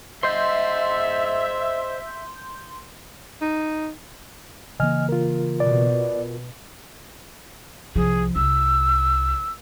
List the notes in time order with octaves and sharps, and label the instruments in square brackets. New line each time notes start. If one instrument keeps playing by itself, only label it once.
[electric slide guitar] C5 D#5 [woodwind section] E5 [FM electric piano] C6 G6
[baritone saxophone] D#4
[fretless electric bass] C#3 E3 A#3 [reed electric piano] D#5 G#5 F6
[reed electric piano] F4 A#4
[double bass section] B2 [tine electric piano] D5
[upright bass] C2 F3 [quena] G#4
[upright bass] C2 [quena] E6